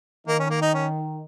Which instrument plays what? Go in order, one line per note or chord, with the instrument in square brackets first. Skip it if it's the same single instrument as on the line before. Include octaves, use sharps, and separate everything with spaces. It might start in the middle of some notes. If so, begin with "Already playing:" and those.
[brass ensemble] D#3 [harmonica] A#3
[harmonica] C#4
A#3
D#4
C#4